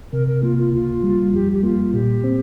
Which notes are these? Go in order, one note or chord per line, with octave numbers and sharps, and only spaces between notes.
C3 A#4
A#4
A#3 F4
F4
C#2 F4
G3
F2 G4
G4
A#3 F4
A#2 G4
C4